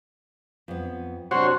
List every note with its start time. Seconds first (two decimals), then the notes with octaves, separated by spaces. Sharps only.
0.68 F2 B3
1.31 C3 D4 F#4 C5 C#5